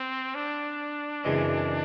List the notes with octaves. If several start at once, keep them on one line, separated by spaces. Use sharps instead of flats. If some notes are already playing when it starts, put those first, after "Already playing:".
Already playing: C4
D4
F#2 C#3 E3 G#3 C4